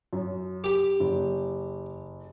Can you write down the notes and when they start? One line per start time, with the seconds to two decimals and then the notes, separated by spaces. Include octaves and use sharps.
0.13 F#2
0.64 G4
1.00 F#1